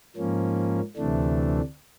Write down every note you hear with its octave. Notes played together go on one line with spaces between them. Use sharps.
G#2 F3 A#3 C#4
D2 C3 E3 A3 D4